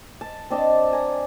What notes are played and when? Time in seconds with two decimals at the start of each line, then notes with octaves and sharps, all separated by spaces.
0.21 A5
0.50 C4 D4 D#5 A5
0.93 G#5 A#5